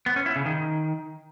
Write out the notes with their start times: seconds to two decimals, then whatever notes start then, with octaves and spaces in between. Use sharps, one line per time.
0.06 B3
0.16 C#4
0.26 E4
0.36 C#3
0.46 D#3